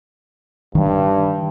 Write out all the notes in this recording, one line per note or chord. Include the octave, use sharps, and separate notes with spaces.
G2 D#3 G3